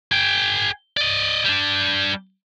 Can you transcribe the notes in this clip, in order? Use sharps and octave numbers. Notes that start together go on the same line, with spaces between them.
G#4 G5
D5 D#5
G3 D4